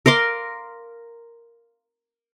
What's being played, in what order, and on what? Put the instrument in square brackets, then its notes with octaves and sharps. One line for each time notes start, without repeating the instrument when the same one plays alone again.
[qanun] A#4 F5 C6 D6